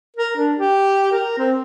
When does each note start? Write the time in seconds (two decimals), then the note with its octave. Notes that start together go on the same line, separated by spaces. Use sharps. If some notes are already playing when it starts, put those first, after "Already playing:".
0.16 A#4
0.36 D4
0.57 G4
1.12 A#4
1.38 C4